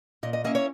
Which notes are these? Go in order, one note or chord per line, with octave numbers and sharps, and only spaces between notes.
A#2 D#5
D#5
A#3 C#4 E4 D#5
C#5